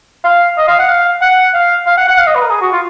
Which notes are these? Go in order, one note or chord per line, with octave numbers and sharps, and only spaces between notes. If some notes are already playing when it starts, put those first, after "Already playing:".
F5
D#5
F5
F#5
F5
F#5
F5
F5
F#5
F#5
F5
D#5
B4
A#4
G#4
F#4
F4